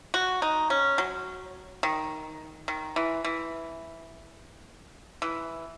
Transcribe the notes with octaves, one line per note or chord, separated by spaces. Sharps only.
F#4
D#4
C#4
F#3
D#3
D#3
E3
E3
E3